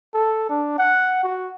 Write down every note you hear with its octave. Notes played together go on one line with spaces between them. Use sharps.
A4
D4
F#5
F#4